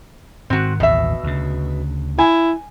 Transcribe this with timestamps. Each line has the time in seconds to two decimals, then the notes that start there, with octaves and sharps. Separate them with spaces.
0.50 G#2 D#3 C4 F#4
0.80 A1 D#2 B2 E5
1.23 D2 C#3
2.19 E4 G#5